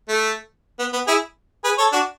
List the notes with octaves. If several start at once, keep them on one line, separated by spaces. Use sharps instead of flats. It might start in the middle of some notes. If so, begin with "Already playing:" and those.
A3
B3
B3
E4 G#4
G#4 B4
A4 C#5
D4 F#4